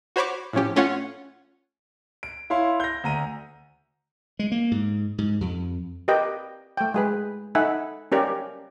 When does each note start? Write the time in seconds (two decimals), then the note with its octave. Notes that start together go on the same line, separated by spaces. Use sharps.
0.16 F#4 C5 C#5 B5 C#6 D6
0.53 A2 F3 C#4 G4
0.76 A3 C#4 F4 C#5 F#5
2.23 D7
2.50 E4 C#5 F5 C6
2.80 G6 A#6
3.04 D2 A#5 D#7
4.39 G#3
4.52 A#3
4.71 G#2
5.18 G#2
5.41 F2
6.08 G4 A#4 B4 D#5 G5
6.77 A3 G5
6.94 G#3 G#4 B4
7.55 D#4 A4 E5 F#5 G#5 B5
8.12 C#4 G4 A#4 D5